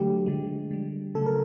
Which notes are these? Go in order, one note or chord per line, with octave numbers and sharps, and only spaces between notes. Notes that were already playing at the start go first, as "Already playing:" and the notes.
Already playing: D3 F#3 A3 G4
D3 F3 G#3
D3 G3
C#3 F#3 A3 A4
A#4